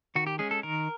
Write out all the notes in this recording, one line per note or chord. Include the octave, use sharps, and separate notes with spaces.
D#3 F#4
G4
G#3 C#4 G#4
A4
D#3 A#4